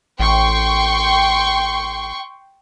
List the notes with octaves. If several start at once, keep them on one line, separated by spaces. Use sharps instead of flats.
A1 G5 C6 C#6